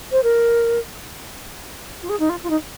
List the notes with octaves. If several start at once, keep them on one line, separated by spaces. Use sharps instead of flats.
C5
A#4
F4
G#4
D#4
F4
F4
D#4